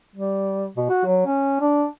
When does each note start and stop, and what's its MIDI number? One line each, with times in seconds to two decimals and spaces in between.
0.16 0.69 55
0.77 0.87 47
0.90 1.03 66
1.05 1.25 54
1.27 1.59 61
1.61 1.85 62